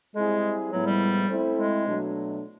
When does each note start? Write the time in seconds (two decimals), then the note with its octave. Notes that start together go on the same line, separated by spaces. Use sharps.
0.15 G3 G#3 C4 E4 G#4
0.72 A2 F3 F#3 G#3 B3 E4
0.86 G3
1.29 A3 C4 E4 A4 C5
1.57 G#3
1.86 B2 F#3 A3 D4